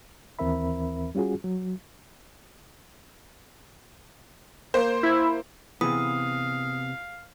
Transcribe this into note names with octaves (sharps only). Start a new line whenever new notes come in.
D#2 E3 C4 A#4 E5 B5
G3 C#4 F4 F#4 G#4
F#3
A#3 C5
E4
C3 E3 B3 G#4 F5 D#6